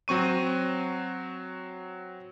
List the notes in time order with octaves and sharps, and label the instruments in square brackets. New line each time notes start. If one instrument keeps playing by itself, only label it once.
[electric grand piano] F#3 C4 C#6 D#7